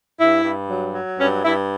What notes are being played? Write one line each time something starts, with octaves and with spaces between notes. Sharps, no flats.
G2 E4
G2
F#3
F#3
G2 C#4
G2 E4